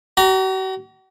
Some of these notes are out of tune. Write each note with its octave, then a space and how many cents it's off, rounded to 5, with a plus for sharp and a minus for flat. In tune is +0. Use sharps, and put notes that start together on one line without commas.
F#4 +45 A#5 -10